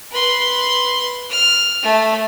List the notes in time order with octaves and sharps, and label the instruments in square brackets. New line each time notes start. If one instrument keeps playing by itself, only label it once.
[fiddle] B4 C6
F6
A3